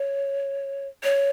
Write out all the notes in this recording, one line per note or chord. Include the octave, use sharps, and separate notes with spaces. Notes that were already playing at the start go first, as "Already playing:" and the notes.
Already playing: C#5
C#5